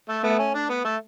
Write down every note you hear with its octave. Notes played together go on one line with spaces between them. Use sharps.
A3
A3 B3
C#4
D4
B3
A3